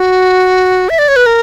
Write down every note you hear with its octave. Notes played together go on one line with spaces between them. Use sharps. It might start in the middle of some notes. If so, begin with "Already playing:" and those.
Already playing: F#4
E5
D5
C#5
B4
A#4